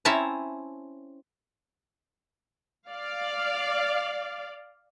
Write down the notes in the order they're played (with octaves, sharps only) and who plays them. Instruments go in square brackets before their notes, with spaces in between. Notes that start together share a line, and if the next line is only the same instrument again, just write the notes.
[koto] C4 C#4 E4 E5 A5 A#5
[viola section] D5 F5